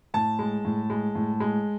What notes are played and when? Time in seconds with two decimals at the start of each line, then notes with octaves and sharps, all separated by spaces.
0.14 A2 A5
0.39 G#3
0.65 A2
0.90 G#3
1.15 A2
1.40 G#3